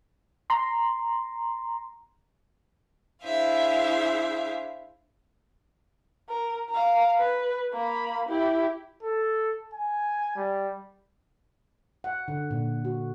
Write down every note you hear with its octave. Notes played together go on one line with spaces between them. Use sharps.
A#5 C6
D4 E4 G#4 C5 E5 F5
A#4
F5 A#5
B4
A#3 B5
E4 G4
A4
G#5
G3
F#5
D3
A#2
F#4